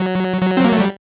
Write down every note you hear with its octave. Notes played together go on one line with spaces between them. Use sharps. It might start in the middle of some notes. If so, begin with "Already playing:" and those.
Already playing: F#3
F#3
C4
A#3
A3
G3